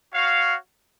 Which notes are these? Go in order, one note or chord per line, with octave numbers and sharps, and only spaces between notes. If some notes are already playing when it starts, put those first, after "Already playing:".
F#4 C#5 F5